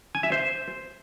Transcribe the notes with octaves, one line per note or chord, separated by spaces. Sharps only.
G#5
E5
C5